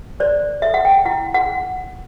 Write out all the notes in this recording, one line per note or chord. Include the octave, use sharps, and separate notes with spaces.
C5 D5
A4 E5
F#5
G5
E4 F#5
F#5